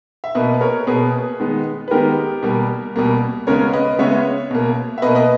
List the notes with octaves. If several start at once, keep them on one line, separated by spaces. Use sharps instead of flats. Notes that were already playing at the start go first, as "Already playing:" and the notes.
E5
B2 A#3 B4 D#5
B4
A#4 C#5
B2 A#3 G#4 B4
D#3 G#3 B3
B4
D#3 G#3 B3 G4 A#4
B2 G3 A#3
B2 G3 A#3
C#3 G#3 B3 A#4 C#5
B4 D#5
C#3 G#3 B3 C#5 E5
B2 A#3
E5
B2 A#3 B4 D#5
B4 D#5